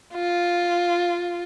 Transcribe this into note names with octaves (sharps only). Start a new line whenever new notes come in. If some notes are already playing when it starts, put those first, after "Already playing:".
F4